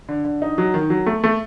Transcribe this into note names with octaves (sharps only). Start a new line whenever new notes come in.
D3
D3
D#4
F#3
D#3
F#3
A3
A3